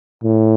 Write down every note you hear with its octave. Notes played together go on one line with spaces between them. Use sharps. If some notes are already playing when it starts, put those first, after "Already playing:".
A2